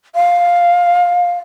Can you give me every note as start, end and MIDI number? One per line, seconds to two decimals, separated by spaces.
0.15 1.39 77